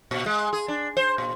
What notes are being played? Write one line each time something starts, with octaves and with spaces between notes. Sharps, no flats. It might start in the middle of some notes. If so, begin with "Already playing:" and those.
A#2
G#3
G#4
D4
C5
A#2